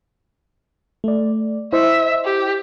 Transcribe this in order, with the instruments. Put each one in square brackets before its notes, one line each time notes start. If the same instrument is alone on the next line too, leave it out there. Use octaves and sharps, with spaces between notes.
[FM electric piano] A3 D5
[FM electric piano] E4 C5 D#5 [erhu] E5
[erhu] G4